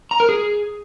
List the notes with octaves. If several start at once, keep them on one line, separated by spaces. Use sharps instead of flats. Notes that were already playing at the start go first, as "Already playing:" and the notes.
A#5
A#4
G#4